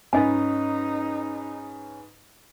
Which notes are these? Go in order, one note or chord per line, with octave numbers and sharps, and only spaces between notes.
G#2 C#4 D#4 B4 D#5 G#5